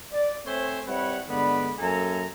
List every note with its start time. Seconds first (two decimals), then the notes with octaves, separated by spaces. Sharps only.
0.12 D5
0.46 A3 C4 C5 C#5 E5 G#5
0.87 G3 C4 E4 B4 C#5 F#5
1.28 G2 D3 G#3 B3 D5 B5
1.79 F#2 A#3 A4 G#5 A#5